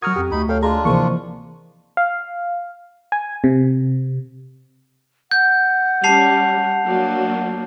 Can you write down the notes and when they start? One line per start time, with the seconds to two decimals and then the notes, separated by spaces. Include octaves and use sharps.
0.02 F#3 F#4 A#4 F#5 C#6 D#6 F6 G#6
0.16 F2 G4
0.32 D2 D#4 B5
0.49 A4 C#5 F5 G5
0.63 G#3 D4 F4 G#4 A#5
0.85 C3 E3 F3 A#3 G#4 C#6
1.97 F5
3.12 G#5
3.44 C3
5.31 F#5 G6
6.04 G3 C#4 A5 C7 F7
6.85 F#3 A#3 D4